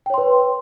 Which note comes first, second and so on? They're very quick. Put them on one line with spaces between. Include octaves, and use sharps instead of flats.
G5 C#5 C6 B4